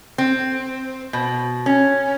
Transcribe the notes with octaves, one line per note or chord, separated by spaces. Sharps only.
C4
B2
C#4